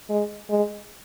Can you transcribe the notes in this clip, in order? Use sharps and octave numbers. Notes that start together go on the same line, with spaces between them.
G#3
G#3